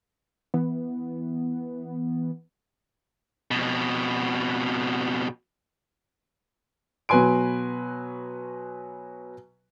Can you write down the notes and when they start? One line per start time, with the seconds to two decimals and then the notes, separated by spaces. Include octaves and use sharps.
0.54 E3 B3
3.51 F2 B2
7.09 B2 F#3 B4 G#5 C6 D7